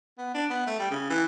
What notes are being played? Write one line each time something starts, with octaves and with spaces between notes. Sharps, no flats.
B3
D4
B3
A3
G3
C#3
E3